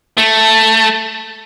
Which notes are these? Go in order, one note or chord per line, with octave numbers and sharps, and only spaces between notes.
A3